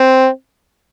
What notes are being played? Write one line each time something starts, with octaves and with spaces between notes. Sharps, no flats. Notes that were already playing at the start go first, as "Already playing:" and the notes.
Already playing: C4